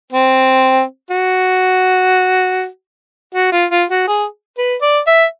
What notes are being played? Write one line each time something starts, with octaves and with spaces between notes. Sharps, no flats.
C4
F#4
F#4
F4
F4
F#4
G#4
B4
D5
E5